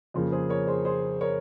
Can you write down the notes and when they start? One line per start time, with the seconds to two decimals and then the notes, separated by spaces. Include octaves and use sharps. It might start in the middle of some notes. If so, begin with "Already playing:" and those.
0.14 F2 C#3 F3 A#3
0.32 G#4 C5
0.49 A#4 C#5
0.67 G#4 C5
0.85 G#4 C5
1.21 A#4 C#5